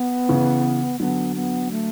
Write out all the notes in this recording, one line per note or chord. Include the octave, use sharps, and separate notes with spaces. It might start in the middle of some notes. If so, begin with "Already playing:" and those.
Already playing: B3
C#3 E3
D3 F#3 B3
B3
A3